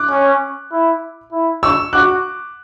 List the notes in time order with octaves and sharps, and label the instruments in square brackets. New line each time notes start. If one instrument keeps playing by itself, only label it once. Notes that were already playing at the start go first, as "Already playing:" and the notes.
Already playing: [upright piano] D6 F#6
[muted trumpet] C#4
E4
E4
[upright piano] C#6 E6
[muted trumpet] F#4 [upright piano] D6 F#6